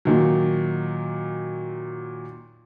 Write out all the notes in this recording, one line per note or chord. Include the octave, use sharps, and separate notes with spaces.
A#2 D#3 F#3